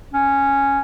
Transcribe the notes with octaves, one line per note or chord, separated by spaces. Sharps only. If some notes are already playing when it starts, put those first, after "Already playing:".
C#4